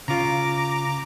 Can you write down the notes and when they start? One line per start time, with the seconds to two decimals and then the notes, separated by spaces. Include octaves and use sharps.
0.08 C#3 F4 A#5 D6